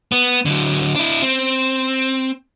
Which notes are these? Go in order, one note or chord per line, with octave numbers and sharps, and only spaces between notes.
B3
D3 F#3
D4 E4
C4